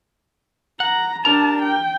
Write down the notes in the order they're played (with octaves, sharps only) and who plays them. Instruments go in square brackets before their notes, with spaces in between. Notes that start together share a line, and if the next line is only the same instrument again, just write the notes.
[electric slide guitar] F#5 [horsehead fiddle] A#5
[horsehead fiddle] D4 A5 [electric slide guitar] G4 A#4 A#5
[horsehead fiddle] G5